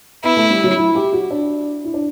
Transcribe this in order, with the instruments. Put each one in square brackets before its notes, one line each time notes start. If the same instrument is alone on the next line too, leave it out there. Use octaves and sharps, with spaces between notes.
[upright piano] B3 [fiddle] E4
[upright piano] A3
G3
F#3
E4
G4
F#4
D4
E4
D4